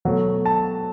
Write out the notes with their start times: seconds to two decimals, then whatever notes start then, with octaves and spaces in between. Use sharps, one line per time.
0.05 B2 F#3 A3
0.46 A5